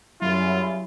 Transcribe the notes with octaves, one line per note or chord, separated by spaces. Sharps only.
F#2 C#3 F#3 G3 E4 F4